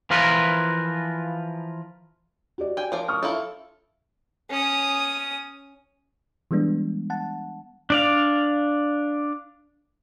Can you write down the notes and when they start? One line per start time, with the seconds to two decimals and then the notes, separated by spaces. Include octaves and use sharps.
0.10 E3 F3 F4 A#4 B4
2.58 F#4 G4 D5
2.77 G5 G#5
2.92 F3 A#4 D5
3.08 C#6 D#6 F6
3.23 E4 F4 A4
4.50 C#4 D#6
6.51 E3 G3 G#3 B3 D4
7.10 F#5 A5
7.90 D4 D5 F5